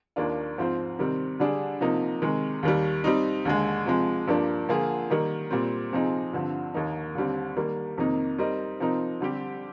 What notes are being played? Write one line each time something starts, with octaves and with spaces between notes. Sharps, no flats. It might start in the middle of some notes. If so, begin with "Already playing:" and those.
D#2 D#3 A#3 D4 F4
G#2 F3 C4 F4 C5
C3 D#3 G3 C4
D3 G3 D4 G#4
C3 F3 A#3 D#4
C3 D#3 G#3
D#2 D#3 G3
G3 C4 D#4
D#2 D3 G#3
C3 F3 G#3
G2 F3 A#3 D4
D3 F3 A#3 F4 G#4
D#3 G3 A#3 D#4
A#2 G3 C4
C3 F3 C4 D#4 G#4
G2 D3 F3 C4
D#2 D#3 A#3 D#4
D#2 D3 G3 C4
D#3 G3 A#3
F2 C3 D#3 A#3 D#4
G3 C4 D#4 A#4 D#5
C3 F3 C4 D#4 A#4
D3 G3 C4 G4